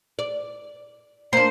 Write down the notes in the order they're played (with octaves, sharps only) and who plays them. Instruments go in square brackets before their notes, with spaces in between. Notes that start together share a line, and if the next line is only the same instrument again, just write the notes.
[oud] D5
[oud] A#3 D4 [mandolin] C5 [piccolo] C7